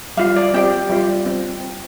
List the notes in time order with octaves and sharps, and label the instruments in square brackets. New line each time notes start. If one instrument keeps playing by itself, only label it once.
[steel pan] G3 F4 F5
D5
C4 G4 G5
G3 F4
C4